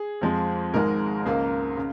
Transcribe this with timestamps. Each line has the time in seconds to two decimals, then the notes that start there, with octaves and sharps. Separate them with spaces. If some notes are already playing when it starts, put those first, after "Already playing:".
Already playing: G#4
0.21 F2 F3 G#3
0.74 G#1 G#2 D#3 G#3 A#4
1.26 C#2 C#3 A#3
1.77 C#3